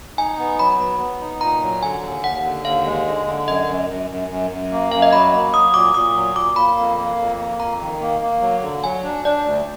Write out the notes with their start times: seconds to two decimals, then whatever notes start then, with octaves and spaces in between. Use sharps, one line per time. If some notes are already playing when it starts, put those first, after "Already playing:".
0.18 D#4 G#5
0.38 B3
0.59 F#3 B5
0.79 B3
1.00 B3
1.20 D#4
1.41 A#2 A#5
1.62 F#3
1.83 D3 G#5
2.03 D#2
2.24 D#2 F#5
2.45 D3
2.65 D#2 F5
2.86 G#3
3.06 D3
3.27 D3
3.48 F#2 D#5
3.68 F#2
3.89 F#2
4.10 F#2
4.30 F#2
4.51 F#2
4.72 A#3
4.92 F#2 F5
5.02 D#5
5.12 F#3 B5
5.33 A#3
5.53 F#3 D#6
5.74 A#2 D6
5.94 A#2 D#6
6.15 F#3
6.36 A#2 D6
6.56 A#3 B5
6.78 F2
6.98 A#3
7.18 F2
7.39 A#3
7.60 F2 A#5
7.81 D#3
8.01 A#3
8.21 A#3
8.42 F#3
8.62 D3
8.84 F#3 G#5
9.04 D4
9.25 D4 D5
9.45 D2